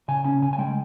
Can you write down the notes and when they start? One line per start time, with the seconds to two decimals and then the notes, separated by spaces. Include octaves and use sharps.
0.08 C#3 G#5
0.24 C#4 G#5
0.42 C#3 G#5
0.53 G#5
0.58 G#3 G5